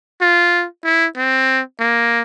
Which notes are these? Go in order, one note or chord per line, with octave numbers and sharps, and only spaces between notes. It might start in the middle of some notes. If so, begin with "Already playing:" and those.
F4
E4
C4
A#3